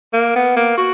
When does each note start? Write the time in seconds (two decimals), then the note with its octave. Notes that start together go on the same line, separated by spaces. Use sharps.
0.13 A#3
0.36 B3
0.56 A#3
0.78 F#4